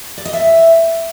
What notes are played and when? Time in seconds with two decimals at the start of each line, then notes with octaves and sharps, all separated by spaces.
0.18 D5
0.25 D#5
0.33 E5